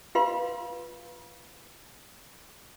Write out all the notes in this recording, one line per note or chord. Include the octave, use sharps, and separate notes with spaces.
F4 B4 F5 C6